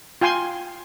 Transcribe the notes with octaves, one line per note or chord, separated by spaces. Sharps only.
F4 G5 G#5 C6